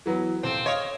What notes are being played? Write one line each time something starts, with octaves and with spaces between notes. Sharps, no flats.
E3 F#3 B3
D#1 C4 D7
C#5 D#5 F5